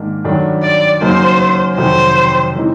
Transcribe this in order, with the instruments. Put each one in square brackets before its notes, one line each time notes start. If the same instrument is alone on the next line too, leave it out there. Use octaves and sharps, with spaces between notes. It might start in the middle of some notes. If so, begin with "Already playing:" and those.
Already playing: [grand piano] G#2 D#3 A#3 D4
G2 D#3 F#3 A3 D4
[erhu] D5
[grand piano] F#2 C#3 F#3 A#3 D#4 [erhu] C5
[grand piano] F2 C3 D#3 F#3 A3 [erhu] C5
[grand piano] C#3 E3 G#3 C4 D#4